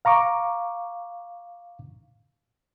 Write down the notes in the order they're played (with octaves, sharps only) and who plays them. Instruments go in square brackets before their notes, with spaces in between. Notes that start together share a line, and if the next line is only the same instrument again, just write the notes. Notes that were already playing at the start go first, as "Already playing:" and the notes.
[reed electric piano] F5 A#5 C#6 D6